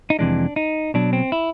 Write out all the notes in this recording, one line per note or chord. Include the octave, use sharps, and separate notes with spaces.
D#4
F2 C3 E3 G#3 D4
D#4
B2 F#3 D4
C4
E4